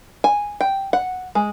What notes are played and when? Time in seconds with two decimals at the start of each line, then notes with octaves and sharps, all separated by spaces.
0.24 G#5
0.61 G5
0.93 F#5
1.35 G#3